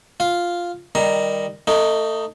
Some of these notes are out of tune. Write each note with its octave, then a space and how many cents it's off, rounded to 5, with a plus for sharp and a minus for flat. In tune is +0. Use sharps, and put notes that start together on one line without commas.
F4 +0 F5 +0
D#3 +0 G3 +10 A#5 +0
A3 +30 D#4 +0